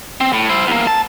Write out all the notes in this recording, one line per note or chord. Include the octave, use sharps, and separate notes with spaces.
C4
A2
E4 C5
E2 A#3
A5